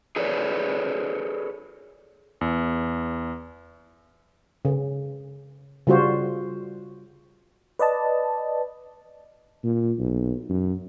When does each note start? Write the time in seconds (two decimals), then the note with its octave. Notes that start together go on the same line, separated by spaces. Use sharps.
0.16 G#4 A4 B4 C#5 D5
2.41 E2
4.65 C#3
5.87 C#3 G3 F4 F#4 C5
7.79 B4 D5 D#5 A5
9.64 A#2
9.99 B1
10.49 F#2